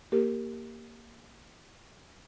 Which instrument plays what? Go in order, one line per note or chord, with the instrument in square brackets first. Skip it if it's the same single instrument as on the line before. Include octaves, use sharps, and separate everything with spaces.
[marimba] A#3 G4 A#4